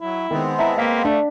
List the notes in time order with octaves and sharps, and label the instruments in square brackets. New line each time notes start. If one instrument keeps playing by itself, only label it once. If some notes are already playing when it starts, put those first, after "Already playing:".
[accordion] F#3 [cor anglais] E4
[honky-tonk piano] D#3 [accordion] G#3 B3 C4
[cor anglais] E4 [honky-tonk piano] E5 A5 A#5
[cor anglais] A#3 [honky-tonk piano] F5 B6
[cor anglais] A3 [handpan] D4